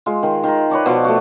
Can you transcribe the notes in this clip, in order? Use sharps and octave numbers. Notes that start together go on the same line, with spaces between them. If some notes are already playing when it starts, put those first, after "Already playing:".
G#3 F4
D#3
D#3 A#4
B4 C#5 D5 A5
B2 F3 D6
A3 F#4